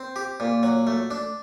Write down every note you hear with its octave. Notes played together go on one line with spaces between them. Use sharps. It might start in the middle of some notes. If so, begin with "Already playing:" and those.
Already playing: C4
G4
A#2
F#3
A3
D4